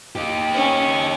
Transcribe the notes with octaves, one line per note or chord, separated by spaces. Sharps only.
D#4 G4
C#4